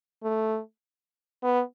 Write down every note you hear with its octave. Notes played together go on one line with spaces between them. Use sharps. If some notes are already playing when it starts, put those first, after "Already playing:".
A3
B3